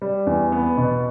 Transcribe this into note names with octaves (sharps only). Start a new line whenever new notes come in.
G3
E2
B3
B2